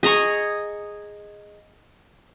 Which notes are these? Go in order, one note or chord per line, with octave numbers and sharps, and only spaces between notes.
G#4 D#5 A#5 C#6